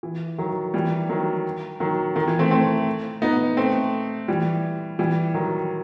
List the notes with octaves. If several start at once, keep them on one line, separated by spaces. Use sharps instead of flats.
E3
D#3 F#3
E3 G3
D#3 F#3
D#3 F#3
D#3
E3
A3 C4
A3 C4
B3 D#4
A3 C4
E3 G3
E3 G3
D#3 F#3